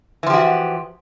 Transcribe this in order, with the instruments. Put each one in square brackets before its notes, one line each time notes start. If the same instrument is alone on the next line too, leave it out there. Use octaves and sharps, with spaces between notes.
[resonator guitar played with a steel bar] E3
F3
G4
F#4